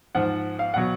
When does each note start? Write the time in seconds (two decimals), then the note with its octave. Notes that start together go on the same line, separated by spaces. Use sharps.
0.15 G#2 F3 F#5
0.59 F5
0.74 B2 F#3 F#5